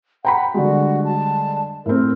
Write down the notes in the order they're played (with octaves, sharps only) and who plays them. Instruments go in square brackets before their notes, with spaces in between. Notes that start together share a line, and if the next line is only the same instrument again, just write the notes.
[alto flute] F#5 [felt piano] G5 A#5 B5
[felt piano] D3 G3 G#3 [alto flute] F#4
[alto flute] A5
[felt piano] A2 C4 [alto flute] A#4